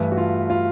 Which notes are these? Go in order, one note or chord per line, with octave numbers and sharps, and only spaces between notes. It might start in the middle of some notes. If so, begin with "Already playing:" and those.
Already playing: G2 E3 A3 B4
F#4
F4
F4